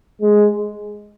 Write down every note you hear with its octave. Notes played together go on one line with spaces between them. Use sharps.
G#3